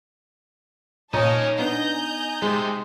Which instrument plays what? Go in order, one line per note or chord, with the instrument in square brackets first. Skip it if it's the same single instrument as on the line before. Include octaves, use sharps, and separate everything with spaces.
[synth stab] A#2 [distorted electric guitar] C#4 A#4 [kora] D#4 [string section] C#5 D#5 A5
[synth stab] B3 D4 [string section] D#5 G#5 G6 [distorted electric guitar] A#5
[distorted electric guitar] C3 [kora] G#3